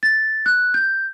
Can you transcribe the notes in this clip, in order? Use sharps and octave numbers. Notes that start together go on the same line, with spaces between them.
A6
F#6
G6